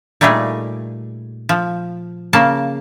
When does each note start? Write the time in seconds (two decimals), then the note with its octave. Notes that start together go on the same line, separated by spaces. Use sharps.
0.21 A#2 G3 A3 D#4 G#4
1.49 F3
2.33 C#3 A#3 A5